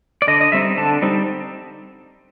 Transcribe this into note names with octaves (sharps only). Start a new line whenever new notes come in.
D5
D3 D#5
D#5
G3 C4 D#4 E5
D3 A5
G3 C4 D#4